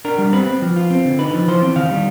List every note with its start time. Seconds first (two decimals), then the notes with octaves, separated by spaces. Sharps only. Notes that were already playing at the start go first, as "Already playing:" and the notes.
0.05 D4 A#4
0.18 G3
0.33 C4 B4
0.47 C4
0.62 F3
0.76 F4
0.90 C4
1.05 D3
1.19 D#4 B4
1.33 F3
1.48 E3 C5
1.62 C4
1.76 D#3 F5
1.90 G3